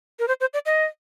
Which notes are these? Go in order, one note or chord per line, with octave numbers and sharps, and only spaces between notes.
A#4
C5
C5
D5
D#5